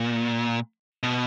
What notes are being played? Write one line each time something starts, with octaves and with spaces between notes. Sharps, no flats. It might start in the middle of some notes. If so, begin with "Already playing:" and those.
Already playing: A#2
B2